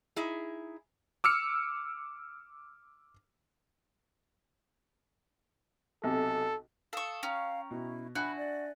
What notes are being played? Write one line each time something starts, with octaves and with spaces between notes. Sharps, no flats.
D#4 E4 G#4
D6 E6 F6 C#7
B1 C3 A4
A4 F5 C#6 D#6
C#4 F5 G5 A#5
B2 E4
D4 F#4 E5 G#5 B5 F#6 C#7
D5